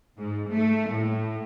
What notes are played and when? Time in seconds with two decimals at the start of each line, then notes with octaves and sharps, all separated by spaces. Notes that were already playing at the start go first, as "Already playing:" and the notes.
0.18 G#2
0.50 A3
0.91 A2